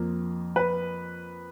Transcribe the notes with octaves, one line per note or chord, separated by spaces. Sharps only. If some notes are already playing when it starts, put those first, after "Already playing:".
Already playing: F2 F3 A#3
B4